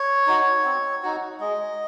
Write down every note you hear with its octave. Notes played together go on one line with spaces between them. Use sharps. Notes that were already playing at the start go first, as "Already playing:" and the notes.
Already playing: C#5
D#4 F#4
C4
D#4 F#4
G#3 D#5